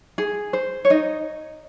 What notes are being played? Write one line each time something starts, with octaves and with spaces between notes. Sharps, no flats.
G#4
C5
C#5
D#4 D#5